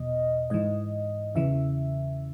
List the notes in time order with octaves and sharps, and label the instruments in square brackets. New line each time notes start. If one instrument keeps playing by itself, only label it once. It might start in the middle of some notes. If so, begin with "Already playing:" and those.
Already playing: [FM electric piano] E2 B2 D#5
G#2 E3 D#5
E2 C#3 E3 E5